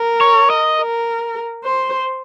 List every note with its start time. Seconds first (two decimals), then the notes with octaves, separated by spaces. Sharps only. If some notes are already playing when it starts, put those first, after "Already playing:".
Already playing: A#4
0.21 C#5
0.50 D#5
0.78 A#4
1.64 C5